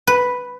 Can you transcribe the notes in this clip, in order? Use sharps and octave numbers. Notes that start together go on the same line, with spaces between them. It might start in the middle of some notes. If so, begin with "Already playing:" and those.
B4